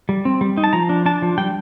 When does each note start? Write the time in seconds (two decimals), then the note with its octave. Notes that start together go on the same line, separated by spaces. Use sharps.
0.09 G3
0.25 C4
0.41 G3
0.57 D#4
0.64 A5
0.73 F3 A#5
0.89 D4
1.06 D4 A5
1.22 F3
1.38 G3 G5